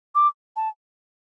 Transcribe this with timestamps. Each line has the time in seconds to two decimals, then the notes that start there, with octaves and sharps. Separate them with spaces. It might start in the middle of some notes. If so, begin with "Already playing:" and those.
0.15 D6
0.56 A5